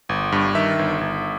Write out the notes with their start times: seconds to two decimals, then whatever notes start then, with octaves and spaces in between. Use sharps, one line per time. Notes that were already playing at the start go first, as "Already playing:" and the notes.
0.09 G1
0.32 G2
0.55 D#3 E5
0.79 G1
1.01 G1